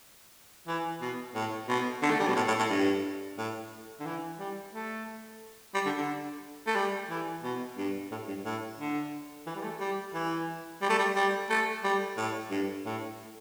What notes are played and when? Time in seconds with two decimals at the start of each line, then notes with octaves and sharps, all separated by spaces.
0.67 E3
1.01 B2
1.35 A2
1.69 B2
2.03 D3
2.11 A3
2.20 G3
2.28 B2
2.36 A2
2.48 A2
2.59 A2
2.70 G2
3.38 A2
4.00 D3
4.06 E3
4.39 G3
4.73 A3
5.75 G3
5.86 D3
5.97 D3
6.67 A3
6.76 G3
7.10 E3
7.44 B2
7.78 G2
8.11 A2
8.28 G2
8.45 A2
8.79 D3
9.47 E3
9.55 G3
9.64 A3
9.80 G3
10.14 E3
10.82 G3
10.90 A3
10.99 G3
11.16 G3
11.50 A3
11.84 G3
12.17 A2
12.51 G2
12.86 A2